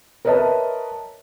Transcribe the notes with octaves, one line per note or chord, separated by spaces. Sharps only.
A#4 B4 C#5 D#5 E5 A5